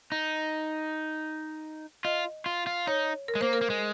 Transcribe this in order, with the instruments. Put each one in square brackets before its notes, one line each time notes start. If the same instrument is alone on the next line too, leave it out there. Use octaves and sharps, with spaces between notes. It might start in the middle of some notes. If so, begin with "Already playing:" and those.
[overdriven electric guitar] D#4
[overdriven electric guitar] F4 [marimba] D#5
[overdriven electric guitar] F4
F4
[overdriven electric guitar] D#4 [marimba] C#5
[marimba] A#4
[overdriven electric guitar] G#3
[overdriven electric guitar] A#3 [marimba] C5
[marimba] A#4
[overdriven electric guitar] A#3
G#3